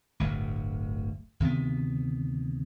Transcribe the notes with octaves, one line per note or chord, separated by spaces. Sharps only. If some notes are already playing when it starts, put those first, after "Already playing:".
D1 G1 D2
D2 C3 D#3 B3